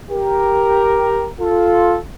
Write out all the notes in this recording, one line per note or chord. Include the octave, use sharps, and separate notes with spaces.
G4 A#4
F4 A4